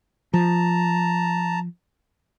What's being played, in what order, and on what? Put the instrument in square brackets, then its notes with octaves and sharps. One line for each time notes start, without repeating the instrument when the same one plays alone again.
[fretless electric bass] F3 [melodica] A5 A#5